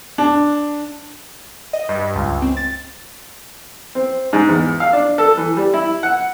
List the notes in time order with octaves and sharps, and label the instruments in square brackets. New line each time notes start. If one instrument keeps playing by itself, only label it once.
[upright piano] D4
[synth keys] D#5
G2
C#2
C4
A6
[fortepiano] C4
G#2
E2
F5
D4
A4
E3
G3
E4
F#5